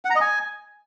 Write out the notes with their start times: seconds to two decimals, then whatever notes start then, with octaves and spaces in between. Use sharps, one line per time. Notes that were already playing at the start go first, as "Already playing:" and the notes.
0.05 F#5
0.10 A#5
0.16 D#5
0.21 G#5